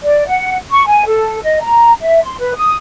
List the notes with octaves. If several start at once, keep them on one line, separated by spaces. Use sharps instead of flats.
D5
F#5
C#6
G#5
A4
D#5
A#5
E5
C6
B4
D#6